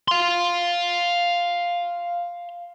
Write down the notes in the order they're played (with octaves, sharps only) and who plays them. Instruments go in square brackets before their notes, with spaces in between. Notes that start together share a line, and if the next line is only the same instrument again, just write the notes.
[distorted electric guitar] F5 C6